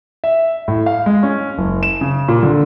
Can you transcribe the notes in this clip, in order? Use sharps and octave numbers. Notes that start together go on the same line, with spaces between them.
E5
A2
F5
G#3
C#4
F#1
E7
C#3
A#2
D3